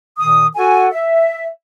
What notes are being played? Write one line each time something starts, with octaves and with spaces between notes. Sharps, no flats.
A#2 D#3 D#6
F#4 A4 F#5 G#5
E5